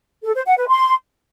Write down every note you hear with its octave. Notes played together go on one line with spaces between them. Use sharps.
A4
C5
F#5
B4
C6